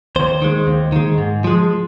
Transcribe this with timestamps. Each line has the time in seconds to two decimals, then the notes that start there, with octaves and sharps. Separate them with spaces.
0.16 D#2 C5
0.42 D#3 G#3
0.67 D#2
0.92 D#3 G#3
1.18 G#2
1.44 F3 G#3